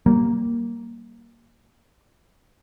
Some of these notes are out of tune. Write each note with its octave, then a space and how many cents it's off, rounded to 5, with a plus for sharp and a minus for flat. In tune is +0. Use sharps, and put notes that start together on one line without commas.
G3 -20 A#3 +0